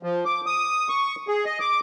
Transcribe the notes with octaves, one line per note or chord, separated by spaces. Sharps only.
F3
D6
D#6
C#6
G#4
D#5
D6